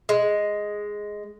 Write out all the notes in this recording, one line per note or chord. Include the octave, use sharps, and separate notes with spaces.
G#3